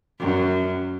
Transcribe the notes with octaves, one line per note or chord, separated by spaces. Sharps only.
F#2